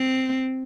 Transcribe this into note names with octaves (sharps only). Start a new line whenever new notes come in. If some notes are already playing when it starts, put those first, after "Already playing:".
Already playing: C4